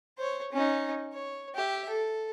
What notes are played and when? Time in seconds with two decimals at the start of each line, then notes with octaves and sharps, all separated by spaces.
0.18 C5 C#5
0.52 C#4 D#4
1.13 C#5
1.55 G4 E5
1.89 A4